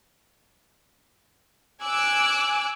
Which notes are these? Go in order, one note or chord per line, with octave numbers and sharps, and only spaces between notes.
G#5 D6 E6 F#6